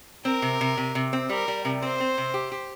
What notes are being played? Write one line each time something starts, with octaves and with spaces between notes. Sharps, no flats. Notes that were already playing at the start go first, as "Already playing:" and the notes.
C4 A#4
C3
C3
C3
C3
C4
G3 A#4
G3
C3
C4 C5
C4
C3
G4
G4